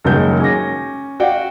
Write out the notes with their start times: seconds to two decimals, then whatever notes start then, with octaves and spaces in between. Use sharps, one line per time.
0.04 F#1 D#3 F#3 G#3 A#4 G6
0.40 C#4 D6 A#6
1.20 F#4 D5 F5 G5